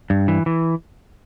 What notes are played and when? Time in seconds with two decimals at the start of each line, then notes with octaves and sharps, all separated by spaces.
0.10 G2
0.28 E3
0.46 E3